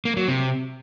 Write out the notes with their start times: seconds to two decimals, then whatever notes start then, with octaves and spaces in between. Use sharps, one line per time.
0.05 A#3
0.17 F#3
0.28 C3